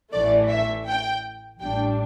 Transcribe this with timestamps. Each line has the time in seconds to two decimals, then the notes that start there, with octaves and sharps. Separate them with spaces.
0.11 A1 A2 E3 A3 D5
0.49 E5
0.87 G5
1.61 A1 A2 G3 D4 G5